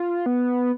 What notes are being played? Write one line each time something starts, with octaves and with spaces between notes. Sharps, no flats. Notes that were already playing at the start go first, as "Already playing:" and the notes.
Already playing: F4
B3